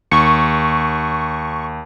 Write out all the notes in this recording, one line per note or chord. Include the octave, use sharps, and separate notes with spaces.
D#2 C#6